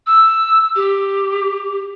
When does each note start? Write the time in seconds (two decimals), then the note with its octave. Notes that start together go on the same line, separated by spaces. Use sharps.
0.06 E6
0.75 G4